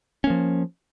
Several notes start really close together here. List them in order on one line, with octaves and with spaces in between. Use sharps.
C#4 A#3 F3